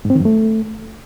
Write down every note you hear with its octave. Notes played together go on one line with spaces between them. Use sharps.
G#2
C4
D#3
F#2
A3